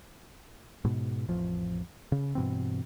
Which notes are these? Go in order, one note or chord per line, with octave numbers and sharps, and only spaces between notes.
G#2 B2
A1 F2 F3
C#3
G2 B2 E3 C4